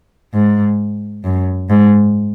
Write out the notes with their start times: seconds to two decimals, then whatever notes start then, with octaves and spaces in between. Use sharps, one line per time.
0.34 G#2
1.24 F#2
1.70 G#2